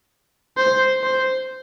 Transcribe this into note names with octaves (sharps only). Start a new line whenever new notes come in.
C5
C5